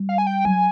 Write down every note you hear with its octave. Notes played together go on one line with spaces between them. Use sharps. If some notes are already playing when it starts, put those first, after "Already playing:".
Already playing: G3
F5
G#5
G5
F#3 G#5